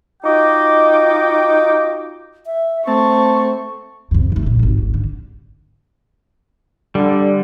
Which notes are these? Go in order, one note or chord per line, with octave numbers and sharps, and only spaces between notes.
D#4 F4 F#4 D#5 G5 D6
E5
A3 C4 A5 C#6
F2 C3
D#3 A3
A#2
G#1 D#2
G#2
D3
D3 G3